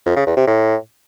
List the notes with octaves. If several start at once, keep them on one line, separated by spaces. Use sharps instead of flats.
F2
C#3
E2
C3
A2